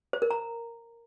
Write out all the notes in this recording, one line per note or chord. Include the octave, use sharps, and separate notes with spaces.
C5
A#4
A#5